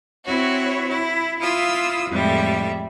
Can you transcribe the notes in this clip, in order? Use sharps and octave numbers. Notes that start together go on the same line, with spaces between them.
C4 E4 F#4 C#5
E4
E4 F4 F5 D#6 E6
F2 A2 G3 G#3 E5